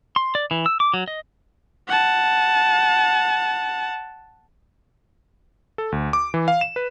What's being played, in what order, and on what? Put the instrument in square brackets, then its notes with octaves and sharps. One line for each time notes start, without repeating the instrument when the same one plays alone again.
[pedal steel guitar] C6
D5
E3
E6
D6
F#3
D#5
[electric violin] F#5 A5
[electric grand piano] A4
D2
D6
E3
F5
E7
B4